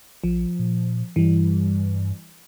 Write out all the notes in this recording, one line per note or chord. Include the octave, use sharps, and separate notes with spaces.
A#1 F3
A#2
G2 E3 G3